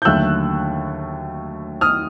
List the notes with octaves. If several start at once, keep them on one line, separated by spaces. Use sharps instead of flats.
G6
D#2 D3 F#3 A3 E6 F#6
D#6 F6